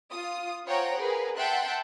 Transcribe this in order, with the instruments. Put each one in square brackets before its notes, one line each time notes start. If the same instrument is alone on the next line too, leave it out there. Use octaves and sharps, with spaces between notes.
[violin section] F4 D#6
F4 C5 C#5 F#5 G5 A#5
G#4 A#4 B4
E5 F#5 G5 A5 C6 F#6